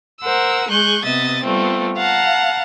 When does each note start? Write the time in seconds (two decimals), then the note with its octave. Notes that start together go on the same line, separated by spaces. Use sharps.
0.23 A#4 C5 F#5 E6
0.69 G#3 G#4 C#6 F#6 G6
1.05 C3 B3 D#5 E5 A6
1.43 G3 A3 B3 C4 F4
1.97 F5 F#5 A5 A#5